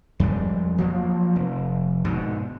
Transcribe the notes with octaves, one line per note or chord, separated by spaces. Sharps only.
F2 G3 G#3
F3 F#3 A#3
F1
G#2 B2 D3